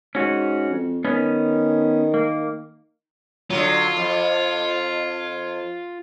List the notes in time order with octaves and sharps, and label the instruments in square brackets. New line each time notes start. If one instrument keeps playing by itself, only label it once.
[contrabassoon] G#2 [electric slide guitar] C#4 F#4
[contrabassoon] F2
[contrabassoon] D#3 [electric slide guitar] B3 C#4
[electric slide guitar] A#3
[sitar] D3 F#3 [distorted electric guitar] F4
[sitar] F2